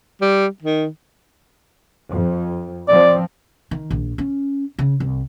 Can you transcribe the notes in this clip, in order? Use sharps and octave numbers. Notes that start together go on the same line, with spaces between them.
G3
D#3
F2
F3 C4 D5
D#3
A#1
C#4
C#3
C2